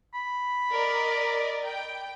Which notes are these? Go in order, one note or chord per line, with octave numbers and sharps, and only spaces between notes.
B5
A#4 D5 D#5
G5